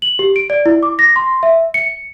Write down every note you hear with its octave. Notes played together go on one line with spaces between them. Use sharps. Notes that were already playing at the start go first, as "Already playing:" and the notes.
F#7
G4
D7
D5
E4
D6
A#6
C6
E5
C#7